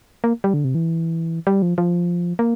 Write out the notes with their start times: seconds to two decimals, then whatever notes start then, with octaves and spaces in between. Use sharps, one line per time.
0.24 A#3
0.44 G3
0.54 D3
0.64 C3
0.75 E3
1.47 G3
1.62 F3
1.78 F3
2.39 A#3